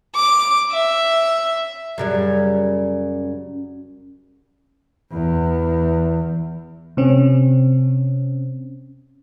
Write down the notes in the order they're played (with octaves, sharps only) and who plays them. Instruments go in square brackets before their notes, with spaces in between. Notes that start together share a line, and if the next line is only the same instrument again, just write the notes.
[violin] D6
E5
[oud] F#2 C#3 G3
[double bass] E2
[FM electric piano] C3 C4 C#4